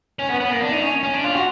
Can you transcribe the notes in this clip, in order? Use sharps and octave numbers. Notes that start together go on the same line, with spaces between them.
C#4
B3
B3
A#3
D4
D#4
C#4
C#4
D4
F4
F#4